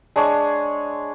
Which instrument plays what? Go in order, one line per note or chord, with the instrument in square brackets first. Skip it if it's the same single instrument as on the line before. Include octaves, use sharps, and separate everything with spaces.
[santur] G#3 D4 C#5